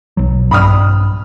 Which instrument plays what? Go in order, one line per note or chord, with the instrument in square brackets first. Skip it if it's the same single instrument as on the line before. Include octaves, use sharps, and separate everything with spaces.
[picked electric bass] B1 F#3
[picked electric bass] A#1 G2 [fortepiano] B5 D#6 F6